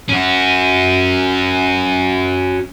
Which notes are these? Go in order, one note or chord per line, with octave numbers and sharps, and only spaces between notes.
C#4 F#4